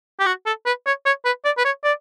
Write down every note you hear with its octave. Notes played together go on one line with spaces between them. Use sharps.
G4
F#4
A4
B4
C#5
C#5
B4
D5
B4
C#5
D5